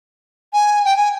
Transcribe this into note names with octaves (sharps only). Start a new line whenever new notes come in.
G#5
G5
G#5